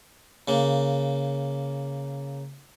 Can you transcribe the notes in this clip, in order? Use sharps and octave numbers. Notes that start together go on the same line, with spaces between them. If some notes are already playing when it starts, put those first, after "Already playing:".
C#3 A#3